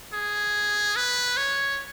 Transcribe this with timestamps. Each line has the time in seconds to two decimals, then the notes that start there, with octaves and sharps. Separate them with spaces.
0.13 G#4
0.96 B4
1.37 C#5